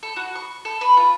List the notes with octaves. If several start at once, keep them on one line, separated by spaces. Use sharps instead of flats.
A4
F#4
C#6
A4
B4
F4